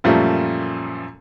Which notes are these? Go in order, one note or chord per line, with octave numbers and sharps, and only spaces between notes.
F#2 A#2 F3 G3 A3 C#4